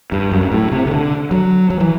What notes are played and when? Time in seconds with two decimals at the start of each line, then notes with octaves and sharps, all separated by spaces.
0.12 G2
0.32 F#2
0.41 G2
0.52 A2
0.72 C3
0.86 C3
0.91 D3
1.31 F#3
1.70 F#3
1.80 E3